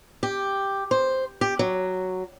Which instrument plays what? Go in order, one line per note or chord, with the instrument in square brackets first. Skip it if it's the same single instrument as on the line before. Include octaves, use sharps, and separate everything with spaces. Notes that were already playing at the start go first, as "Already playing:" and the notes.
[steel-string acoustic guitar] G4
C5
G4
F#3